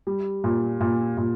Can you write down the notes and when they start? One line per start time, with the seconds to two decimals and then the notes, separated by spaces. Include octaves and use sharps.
0.07 G3
0.44 A#2
0.81 A#2
1.17 A#2